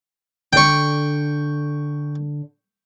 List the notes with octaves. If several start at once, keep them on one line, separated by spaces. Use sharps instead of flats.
D3 D5 G5 C#6